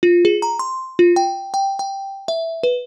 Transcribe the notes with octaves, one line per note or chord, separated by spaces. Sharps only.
F4
G#4
A#5
C6
F4
G5
G5
G5
E5
B4